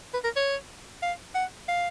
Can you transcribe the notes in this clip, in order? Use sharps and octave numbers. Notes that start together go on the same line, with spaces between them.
B4
A#4
C#5
F5
F#5
F5